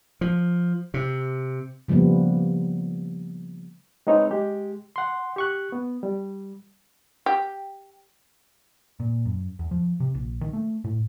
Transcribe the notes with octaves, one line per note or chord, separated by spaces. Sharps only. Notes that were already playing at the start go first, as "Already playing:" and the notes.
F3
C3
C#3 F3 G3 A#3 B3
G#3 C4 D#4 B4 C#5
G#3 G4
F#5 C6
G4 C#6 F#6
B3
G3
G4
A#2
F#2
E2
F3
C3
A#1
D#3
A3
A2